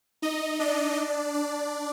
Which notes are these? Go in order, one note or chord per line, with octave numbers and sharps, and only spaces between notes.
D#4 D#5
D4 D5
D4 D5